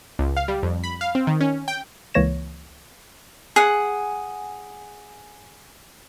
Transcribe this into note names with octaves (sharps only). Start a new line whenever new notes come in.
C#2
F5
G3
F2
B5
F5
C4
D#3
C#4
G5
C#2 E3 A#3 C#5 A#6 E7
G#4 F#5